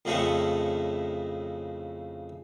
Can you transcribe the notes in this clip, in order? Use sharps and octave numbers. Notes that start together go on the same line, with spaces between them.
F2 A2 C#3 G#3 A3 C#4